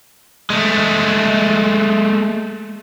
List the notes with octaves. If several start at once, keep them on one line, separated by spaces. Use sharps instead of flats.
G#3 A3